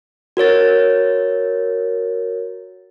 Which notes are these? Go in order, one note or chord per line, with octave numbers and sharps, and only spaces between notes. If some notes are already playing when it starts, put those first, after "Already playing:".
F#4 A#4 C#5 A6